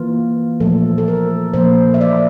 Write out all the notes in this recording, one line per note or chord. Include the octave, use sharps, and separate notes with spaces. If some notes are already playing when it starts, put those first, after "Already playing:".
Already playing: E3 A#3 F4
A#2 F3 A3 A4
A4
A#4
A#2 F3 A#3 C5
E5
D5